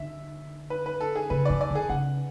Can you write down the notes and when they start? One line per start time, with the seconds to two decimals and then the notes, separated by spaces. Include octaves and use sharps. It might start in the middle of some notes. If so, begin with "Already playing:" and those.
Already playing: D3 E5
0.70 B4
0.86 B4
1.00 A4
1.16 G#4
1.30 C#3 B4
1.45 E3 D5
1.61 D5
1.70 D3 G#4
1.90 C#3 F#5